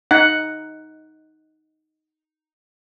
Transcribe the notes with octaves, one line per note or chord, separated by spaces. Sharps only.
D#4 F#5